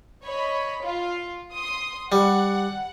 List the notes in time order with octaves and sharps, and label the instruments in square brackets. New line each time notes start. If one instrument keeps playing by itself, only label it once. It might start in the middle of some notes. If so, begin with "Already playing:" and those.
[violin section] C#5 D#5 B5
F4
C6 D#6
[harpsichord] G3 [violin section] F#5